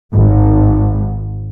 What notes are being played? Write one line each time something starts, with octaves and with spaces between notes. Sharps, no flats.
G#1